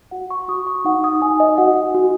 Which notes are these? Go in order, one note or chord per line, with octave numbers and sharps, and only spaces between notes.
F#4 F#5
C#6
F#4 D#6
C#6
D#4 F#5
D#6
D#4 G#5
D#5
F#4 F#5
F#4